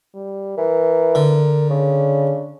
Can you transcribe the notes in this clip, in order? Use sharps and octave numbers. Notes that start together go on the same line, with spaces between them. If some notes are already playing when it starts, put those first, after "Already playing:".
G3
E3 A#4
D3
C#3 D4